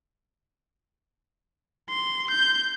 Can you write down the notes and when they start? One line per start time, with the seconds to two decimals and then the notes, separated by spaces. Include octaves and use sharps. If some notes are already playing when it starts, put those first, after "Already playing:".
1.90 C6
2.31 G6